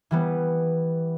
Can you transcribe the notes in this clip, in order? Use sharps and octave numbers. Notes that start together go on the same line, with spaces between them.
E3 G3 B3